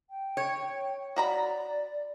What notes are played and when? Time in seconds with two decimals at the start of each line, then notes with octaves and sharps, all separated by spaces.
0.10 G5
0.37 C#5
1.16 F#4 D5 A#5 B5